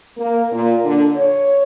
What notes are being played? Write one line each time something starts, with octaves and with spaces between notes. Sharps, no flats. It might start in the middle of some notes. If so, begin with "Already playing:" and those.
A#3
A#2
D3
C#5